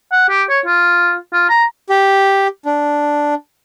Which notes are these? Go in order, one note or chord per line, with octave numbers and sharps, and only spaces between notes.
F#5
G4
C#5
F4
F4
A#5
G4
D4